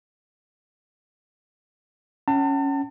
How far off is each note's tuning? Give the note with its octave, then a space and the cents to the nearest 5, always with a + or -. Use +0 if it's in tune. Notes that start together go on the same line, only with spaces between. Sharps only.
C#4 +0 F#5 +45 A5 +35